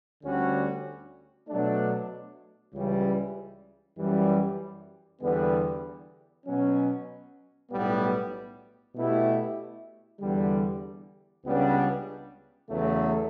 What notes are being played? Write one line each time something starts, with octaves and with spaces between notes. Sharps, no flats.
D2 D3 G3 C#4 F#4
B2 F#3 A3 D4
C#2 C#3 E3 G3
F#2 E3 G3
E2 D3 G3 B3
B2 F#3 C#4
B1 A2 G3 B3
B2 A3 E4 G4
E2 D3 G3
C#2 C#3 G3 B3 D4
E2 C#3 F#3 A3